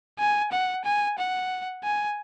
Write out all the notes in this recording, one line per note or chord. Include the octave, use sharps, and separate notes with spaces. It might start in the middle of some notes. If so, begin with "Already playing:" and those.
G#5
F#5
G#5
F#5
G#5